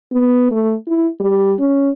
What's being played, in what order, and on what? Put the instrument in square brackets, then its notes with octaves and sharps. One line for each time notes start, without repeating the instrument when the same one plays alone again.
[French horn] B3
A3
E4
G3
C#4